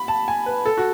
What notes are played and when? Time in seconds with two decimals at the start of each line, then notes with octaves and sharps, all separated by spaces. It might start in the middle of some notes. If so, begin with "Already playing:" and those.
Already playing: B5
0.08 A5
0.28 G#5
0.46 B4
0.65 A4
0.77 F#4